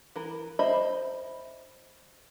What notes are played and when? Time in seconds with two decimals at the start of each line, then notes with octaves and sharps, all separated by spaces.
0.16 E3 A#4
0.59 C5 D#5 E5 B5